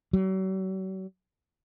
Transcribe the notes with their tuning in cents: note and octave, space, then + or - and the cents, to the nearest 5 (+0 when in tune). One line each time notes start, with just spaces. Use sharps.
F#3 +40